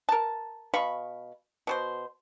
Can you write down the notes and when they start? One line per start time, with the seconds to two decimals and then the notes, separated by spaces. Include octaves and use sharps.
0.09 A#4 A5
0.74 B2 F5 B5 C#6
1.67 B2 F#4 C5